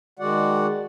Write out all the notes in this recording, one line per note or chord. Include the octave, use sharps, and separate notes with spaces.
D#3 G#3 F#4 D5 F#5